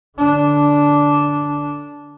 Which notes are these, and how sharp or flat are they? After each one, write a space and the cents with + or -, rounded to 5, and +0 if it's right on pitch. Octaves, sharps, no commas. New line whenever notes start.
D3 +0 D4 -10